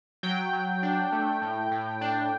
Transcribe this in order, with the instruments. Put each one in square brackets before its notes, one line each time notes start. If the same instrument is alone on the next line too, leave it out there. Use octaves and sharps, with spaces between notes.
[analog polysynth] F#3 G5
F#3
D4
A3
A2
A2
D4